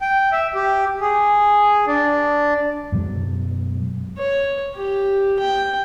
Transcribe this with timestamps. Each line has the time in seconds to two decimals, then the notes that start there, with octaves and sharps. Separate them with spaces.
0.02 G5
0.32 E5
0.55 G4
1.01 G#4
1.87 D4
2.92 F#2 B2 F#3 G#3
4.18 C#5
4.75 G4
5.39 G5